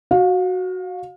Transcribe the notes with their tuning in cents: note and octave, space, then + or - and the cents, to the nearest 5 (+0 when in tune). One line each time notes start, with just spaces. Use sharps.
F#4 -5 F5 +30